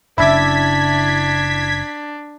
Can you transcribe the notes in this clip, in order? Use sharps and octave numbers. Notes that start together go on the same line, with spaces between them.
F#1 C#3 D4 E4 E5 D6 G#6 B6